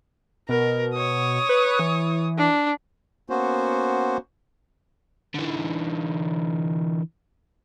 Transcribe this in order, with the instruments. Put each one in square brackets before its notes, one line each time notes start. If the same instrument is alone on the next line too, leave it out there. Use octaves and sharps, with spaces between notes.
[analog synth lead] B2 [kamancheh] A#4
[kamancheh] C#5 D#6
[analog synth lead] B4
E3
[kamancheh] D4
[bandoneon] A#3 B3 C#4 F#4 C5
[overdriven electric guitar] D3 E3